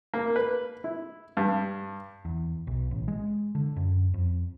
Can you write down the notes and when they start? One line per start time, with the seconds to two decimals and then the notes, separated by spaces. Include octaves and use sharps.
0.14 A#3
0.36 B4
0.84 E4
1.37 G2
2.25 E2
2.67 B1
2.91 A1
3.08 G#3
3.55 D3
3.76 F#2
4.14 F2